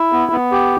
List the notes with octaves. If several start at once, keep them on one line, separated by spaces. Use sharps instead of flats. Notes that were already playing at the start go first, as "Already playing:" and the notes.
Already playing: E4
B3
B3
G4